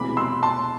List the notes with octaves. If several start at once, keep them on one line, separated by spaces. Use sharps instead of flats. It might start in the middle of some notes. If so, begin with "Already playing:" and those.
Already playing: E1 D2 C3 E3 G#3 B5 D6
C6 E6
A5 C6